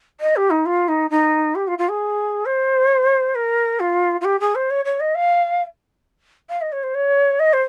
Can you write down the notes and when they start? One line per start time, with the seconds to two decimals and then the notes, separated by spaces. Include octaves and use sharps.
0.20 D#5
0.36 G4
0.50 D#4
0.66 F4
0.88 D#4
1.10 D#4
1.55 G4
1.67 F4
1.78 F4
1.89 G#4
2.45 C5
3.35 A#4
3.80 F4
4.21 F4
4.24 G4
4.40 G#4
4.55 C5
4.70 C#5
4.85 C#5
5.00 D#5
5.15 F5
6.49 F5
6.61 D#5
6.72 C#5
6.83 C5
6.94 C#5
7.39 D#5
7.53 C5